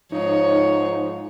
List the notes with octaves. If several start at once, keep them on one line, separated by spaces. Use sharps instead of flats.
G#2 F3 D#4 C#5